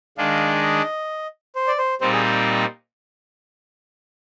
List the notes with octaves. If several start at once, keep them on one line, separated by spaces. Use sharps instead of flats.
D#3 G#3 D4 F5
D#5
C5
D5
C5
A#2 G3 C4 D#4 C5
G#4